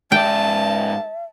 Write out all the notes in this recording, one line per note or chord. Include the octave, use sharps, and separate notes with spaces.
G#2 D5 E5 G5 A5